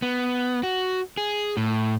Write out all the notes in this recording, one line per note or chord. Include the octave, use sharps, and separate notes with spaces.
B3
F#4
G#4
A2